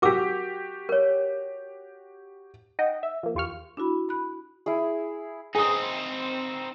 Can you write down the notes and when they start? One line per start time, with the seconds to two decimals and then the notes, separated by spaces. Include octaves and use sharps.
0.02 F#4 G4 A#4 D6 E6
0.89 A#4 C#5
2.79 D#4 D#5 F#5 G5
3.03 E5
3.23 F3 A#3
3.35 E2 F4 G4 C#6 F6
3.77 D4 E4 F#4 B5
4.09 B5 F#6
4.66 E4 G#4
5.55 C4 D#4 G#4 D#6